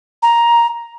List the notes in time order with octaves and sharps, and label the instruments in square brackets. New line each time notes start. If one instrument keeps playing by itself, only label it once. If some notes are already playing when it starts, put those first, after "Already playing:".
[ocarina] A#5